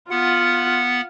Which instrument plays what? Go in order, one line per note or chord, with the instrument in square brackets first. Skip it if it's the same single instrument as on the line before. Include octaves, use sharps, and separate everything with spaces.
[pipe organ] B3 F#5 [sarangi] F4